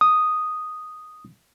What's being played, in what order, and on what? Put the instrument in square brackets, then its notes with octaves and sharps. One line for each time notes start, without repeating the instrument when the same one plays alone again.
[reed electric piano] D#6